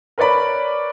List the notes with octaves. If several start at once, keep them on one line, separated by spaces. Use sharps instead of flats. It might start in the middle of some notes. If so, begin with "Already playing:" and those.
A#4 B4 C#5 D5 B5